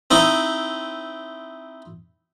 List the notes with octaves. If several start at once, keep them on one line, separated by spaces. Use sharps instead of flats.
C4 D#4 E4